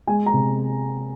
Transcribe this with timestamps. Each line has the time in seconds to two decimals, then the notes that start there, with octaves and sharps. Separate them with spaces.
0.07 G#3 G#5
0.26 A#5
0.33 C3